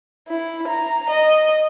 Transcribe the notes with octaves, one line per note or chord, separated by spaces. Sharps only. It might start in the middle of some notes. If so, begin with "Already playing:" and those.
E4
A#5
D#5